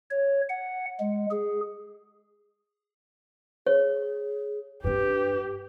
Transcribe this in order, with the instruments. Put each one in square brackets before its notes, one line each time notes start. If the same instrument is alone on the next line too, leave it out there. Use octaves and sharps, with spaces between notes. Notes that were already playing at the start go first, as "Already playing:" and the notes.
[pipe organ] C#5
F#5
G#3
G#4
[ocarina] G#4 [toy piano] C#5
[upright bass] G2 D4 [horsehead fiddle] G4 [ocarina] B4